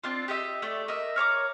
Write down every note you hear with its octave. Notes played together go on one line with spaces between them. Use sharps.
C4 D4 F4
G4 D#5 E5
A3 D5
A#4 D#5 E5
A#4 C#5 A#5 D6